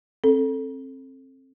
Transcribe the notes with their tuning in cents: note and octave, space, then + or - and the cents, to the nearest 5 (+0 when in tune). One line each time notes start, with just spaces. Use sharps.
C4 +25 A4 +0